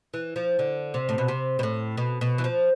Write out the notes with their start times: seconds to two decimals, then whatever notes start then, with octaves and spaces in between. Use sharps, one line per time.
0.14 E3
0.36 F3
0.59 D3
0.94 C3
1.09 A2
1.18 B2
1.28 C3
1.59 B2
1.63 A2
1.97 B2
2.21 B2
2.38 E3
2.44 F3